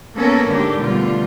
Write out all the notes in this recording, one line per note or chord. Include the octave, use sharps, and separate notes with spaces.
A#3 B3 C#4 A4 A#4
G#2 D3 D4 G4
B2 D3 G3 A3 F4